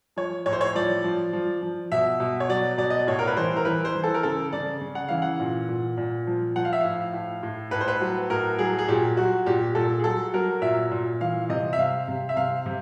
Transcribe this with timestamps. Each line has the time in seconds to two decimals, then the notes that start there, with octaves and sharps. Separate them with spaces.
0.16 F3 C#5
0.46 A2 C#5
0.53 C5
0.61 C#5
0.75 F3 D5
1.04 F3
1.33 F3
1.62 F3
1.92 B2 E5
2.20 B2
2.40 C#5
2.49 F#3 D5
2.78 B2 D5
2.90 D#5
2.99 D5
3.07 A2 C#5
3.19 A#4
3.27 B4
3.37 E3 C5
3.56 A#4
3.65 E3 B4
3.85 C5
3.95 E3
4.04 A4
4.14 A#4
4.23 C#3 A4
4.52 C#3 D5
4.81 C#3
4.95 F#5
5.08 E3 F5
5.22 F#5
5.40 A#2
5.69 A#2
5.97 A#2
6.27 F3
6.56 F3 F#5
6.65 F5
6.73 E5
6.81 A2 F5
7.14 A2
7.43 A2
7.71 A2 B4
7.81 C5
7.88 B4
8.01 F#3
8.30 A2 A#4
8.59 F#3 G#4
8.79 G#4
8.88 A#2 G4
9.17 F#3 F#4
9.46 A#2 G4
9.75 A#2 A4
9.99 G#4
10.04 F#3 A4
10.34 F#3 A#4
10.62 A#2 E5
10.91 A#2
11.21 E3 F5
11.49 C3 D#5
11.73 E5
11.78 C3 F5
12.08 C3
12.29 E5
12.36 C3 F5
12.66 C3